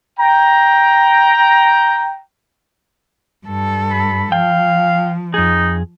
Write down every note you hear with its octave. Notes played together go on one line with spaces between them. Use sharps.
G5 A#5
G2 A4
B5
F3 F5 G5
F2 D#4 G#4